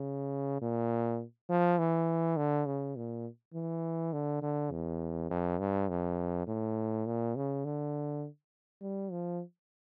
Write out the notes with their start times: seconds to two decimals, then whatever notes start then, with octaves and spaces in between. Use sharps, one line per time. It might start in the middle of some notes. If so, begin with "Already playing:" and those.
Already playing: C#3
0.62 A#2
1.50 F3
1.79 E3
2.37 D3
2.66 C#3
2.96 A#2
3.54 E3
4.13 D3
4.42 D3
4.71 E2
5.30 F2
5.59 G2
5.89 F2
6.47 A2
7.06 A#2
7.36 C#3
7.65 D3
8.82 G3
9.11 F3